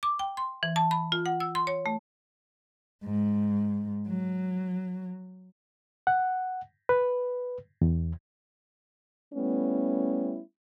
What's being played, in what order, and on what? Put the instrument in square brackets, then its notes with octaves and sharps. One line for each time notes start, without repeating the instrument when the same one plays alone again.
[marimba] D6
G5
C6
E3
A5
B5
F4
F#5
E6
C6
C#5
A3
[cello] G#2
F#3
[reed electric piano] F#5
B4
E2
[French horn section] G3 A3 B3 C#4 E4